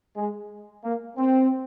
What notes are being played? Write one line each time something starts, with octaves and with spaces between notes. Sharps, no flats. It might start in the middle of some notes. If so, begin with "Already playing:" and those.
G#3
A#3
C4